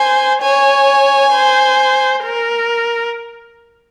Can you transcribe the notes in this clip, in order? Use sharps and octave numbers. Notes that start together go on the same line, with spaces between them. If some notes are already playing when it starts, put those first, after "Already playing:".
Already playing: C5 G#5
C#5 G#5
C5
A#4